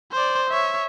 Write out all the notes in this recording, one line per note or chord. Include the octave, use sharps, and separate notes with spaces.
C5 D5
C#5 E5